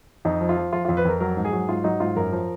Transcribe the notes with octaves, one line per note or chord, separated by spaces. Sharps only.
F2 D#4
F3
F4
F3
F3 F4
F2 F4
B4
F2 A#4
F#3 A#4
G#2
G#4
F#3
G#2 F4
F#3 D#4
G#2 F4
F#2 A#4
F3